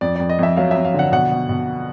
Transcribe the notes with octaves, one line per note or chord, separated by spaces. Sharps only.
F2 D5
F2 D5
D#5
F2 E5
F#3 F5
E5
F2
F5
D3 F#5
B2 F#5
B2
B2